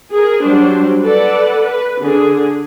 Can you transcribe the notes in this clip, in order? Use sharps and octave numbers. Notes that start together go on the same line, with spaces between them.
G#4 A#4
F#3 G3 D4 C5
A4 B4 D5 F#5
B4
D3 G#4